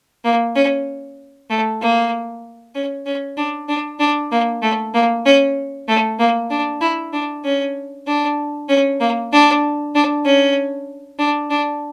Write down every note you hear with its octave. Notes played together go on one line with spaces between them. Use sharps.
A#3
C#4
A3
A#3
C#4
C#4
D4
D4
D4
A#3
A3
A#3
C#4
A3
A#3
D4
E4
D4
C#4
D4
C#4
A#3
D4
D4
C#4
D4
D4